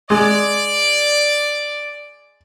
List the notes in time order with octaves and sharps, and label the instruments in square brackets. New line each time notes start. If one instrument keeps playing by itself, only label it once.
[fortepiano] G#3 [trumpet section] D5